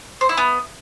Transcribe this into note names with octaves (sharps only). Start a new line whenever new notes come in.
C5
E4
B3